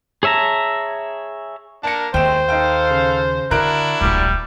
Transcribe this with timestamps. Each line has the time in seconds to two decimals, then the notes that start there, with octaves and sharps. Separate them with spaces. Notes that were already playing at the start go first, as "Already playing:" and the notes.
0.23 G#4 C#5 E5 A5 A#5
1.83 A#3 D4 A#4 A5 C#7
2.14 D#2 G#3 A3 C4 C5 G5 E7
2.49 D#4 A4 F5 G5
2.90 C#3
3.51 D3 D4 E4 F#4 A#4 F#6 D7
4.01 D1 A#1 G3